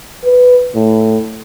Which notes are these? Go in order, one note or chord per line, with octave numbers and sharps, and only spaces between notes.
B4
A2